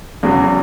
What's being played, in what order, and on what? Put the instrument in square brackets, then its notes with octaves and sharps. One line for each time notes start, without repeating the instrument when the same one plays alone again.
[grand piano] E2 C#3 F#3